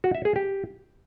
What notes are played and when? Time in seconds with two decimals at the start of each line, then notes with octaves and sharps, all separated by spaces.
0.04 F#4
0.15 E5
0.25 G#4
0.36 G4